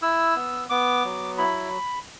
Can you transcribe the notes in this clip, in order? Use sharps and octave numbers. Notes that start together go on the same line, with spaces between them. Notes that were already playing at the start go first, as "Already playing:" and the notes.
E4 E6
B3
B3 D6
F#3
E4 B5